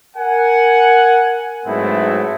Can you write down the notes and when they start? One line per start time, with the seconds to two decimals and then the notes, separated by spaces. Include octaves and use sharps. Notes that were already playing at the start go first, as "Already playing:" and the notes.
0.17 A#4 F#5 G#5
1.66 G#2 F#3 A3 B3 C4 E4